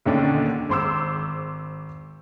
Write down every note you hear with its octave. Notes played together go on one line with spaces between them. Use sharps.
D#2 A#2 D3 D#3 C#4 D4
G#1 C5 C6 D6 E6